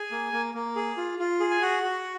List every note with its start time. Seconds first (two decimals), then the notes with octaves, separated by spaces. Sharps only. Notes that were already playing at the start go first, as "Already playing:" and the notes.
Already playing: G#4 G#5
0.11 A#3
0.33 A#3
0.54 A#3
0.76 G#4
0.97 F4
1.19 F4
1.40 G#4
1.51 G#5
1.62 F#4 F#5
1.83 F#4